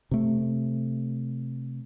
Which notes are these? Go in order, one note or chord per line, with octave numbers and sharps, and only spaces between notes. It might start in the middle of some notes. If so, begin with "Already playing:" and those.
C3 A3